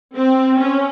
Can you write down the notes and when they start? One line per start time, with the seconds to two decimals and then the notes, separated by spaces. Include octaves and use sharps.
0.15 C4
0.59 C#4